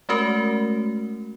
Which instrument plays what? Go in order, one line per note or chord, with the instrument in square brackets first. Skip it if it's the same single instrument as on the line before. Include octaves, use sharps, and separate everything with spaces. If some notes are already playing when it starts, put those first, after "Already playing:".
[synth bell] G#3 A3 C#4 F#4 A#4